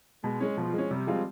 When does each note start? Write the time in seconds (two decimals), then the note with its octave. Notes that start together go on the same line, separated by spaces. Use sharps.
0.24 B2 G#3
0.40 G#3 C#4
0.57 B2 F3
0.74 G#3 C#4
0.91 C3 G3
1.07 F3 G#3 C4 F4